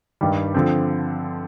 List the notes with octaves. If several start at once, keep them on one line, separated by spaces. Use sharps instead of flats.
G2 D#3 G3
D3 F3 C4